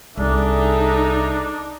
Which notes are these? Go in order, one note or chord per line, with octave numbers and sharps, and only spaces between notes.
C2 D4 D#4 G#4 A4 E5